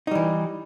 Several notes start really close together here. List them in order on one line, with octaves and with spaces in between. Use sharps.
D#4 G3 E3